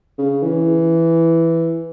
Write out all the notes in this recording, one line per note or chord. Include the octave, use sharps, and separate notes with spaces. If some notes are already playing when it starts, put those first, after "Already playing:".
C#3
E3